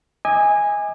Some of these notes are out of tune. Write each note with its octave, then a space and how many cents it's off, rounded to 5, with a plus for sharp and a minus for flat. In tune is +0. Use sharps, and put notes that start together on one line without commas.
D#5 +35 G#5 -15 D6 +30